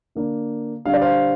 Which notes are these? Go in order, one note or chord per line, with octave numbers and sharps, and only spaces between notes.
D3 A#3 D4
D3 G3 D4 F5
D5
C5 F5